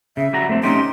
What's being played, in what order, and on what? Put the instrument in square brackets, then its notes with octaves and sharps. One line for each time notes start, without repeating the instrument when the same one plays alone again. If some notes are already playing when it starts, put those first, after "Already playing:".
[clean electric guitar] C#3 [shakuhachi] E5
[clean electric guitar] G3 F#4 A#5
A3 C4
[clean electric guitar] C#4 D#4 G4 [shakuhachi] C6